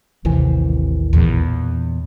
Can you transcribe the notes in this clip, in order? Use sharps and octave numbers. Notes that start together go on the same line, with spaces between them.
A1 D#2 C3 E3
E2 A#2